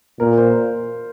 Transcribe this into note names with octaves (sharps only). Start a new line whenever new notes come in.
A#2 A#4
C5